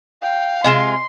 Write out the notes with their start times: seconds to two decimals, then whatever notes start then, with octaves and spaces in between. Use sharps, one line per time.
0.22 F5 G5
0.64 C3 G#3 F4 D#5 C6 E7